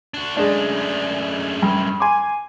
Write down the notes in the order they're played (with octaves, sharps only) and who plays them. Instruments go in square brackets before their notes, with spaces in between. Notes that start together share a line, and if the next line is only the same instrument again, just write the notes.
[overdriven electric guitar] D4 F#4
[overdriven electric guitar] F#2 A3 [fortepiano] G#3 D4
[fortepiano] G2
G#5 C6 D6